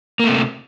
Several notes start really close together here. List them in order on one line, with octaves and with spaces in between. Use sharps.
A#3 A3 C3